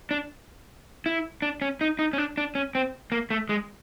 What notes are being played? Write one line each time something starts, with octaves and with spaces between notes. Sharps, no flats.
D4
E4
D4
C#4
D#4
D#4
C#4
D4
D4
C#4
C4
A#3
A3
G#3